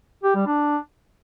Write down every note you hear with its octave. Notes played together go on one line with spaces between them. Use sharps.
G4
G3
D4